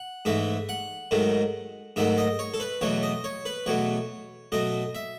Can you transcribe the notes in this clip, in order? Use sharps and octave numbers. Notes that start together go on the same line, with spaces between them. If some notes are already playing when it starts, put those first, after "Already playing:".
Already playing: F#5
G#2 E3 A3 E5
F#5
G#2 D#3 F#3 A3
G#2 D#3 F#3 A3 E5
D#5
C#5
A4
B4
E2 B2 F#3 A3 C#5
D#5
C#5
B4
E2 B2 F#3 A3 C#5
B2 F#3 A3 D#5
E5